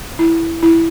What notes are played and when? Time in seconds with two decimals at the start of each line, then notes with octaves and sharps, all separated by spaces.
0.19 E4
0.63 E4